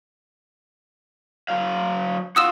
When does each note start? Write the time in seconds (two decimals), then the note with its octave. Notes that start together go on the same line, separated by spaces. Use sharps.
1.48 F#3 F5
2.36 F4 F#4 D#6 E6 E7